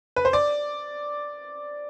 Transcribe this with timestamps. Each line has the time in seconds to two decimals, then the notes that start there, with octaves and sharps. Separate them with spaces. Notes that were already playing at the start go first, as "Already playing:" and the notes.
0.16 B4
0.25 C5
0.33 D5